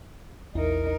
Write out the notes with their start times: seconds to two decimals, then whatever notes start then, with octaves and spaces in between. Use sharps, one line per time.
0.55 A#1 E2 D#4 E4 A#4